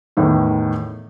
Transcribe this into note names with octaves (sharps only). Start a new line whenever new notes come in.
E2 A2 D#3